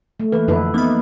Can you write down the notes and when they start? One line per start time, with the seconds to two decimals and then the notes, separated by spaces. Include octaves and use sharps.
0.20 A3
0.32 E3 A#3 B4
0.48 F2 D3 F3 E4 B4
0.74 A#3 B3 D#4 B5